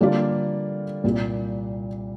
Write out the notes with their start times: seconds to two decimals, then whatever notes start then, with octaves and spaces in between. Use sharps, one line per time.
0.01 D3 G3 A#3 F4 D5
1.04 C2 A#2 G3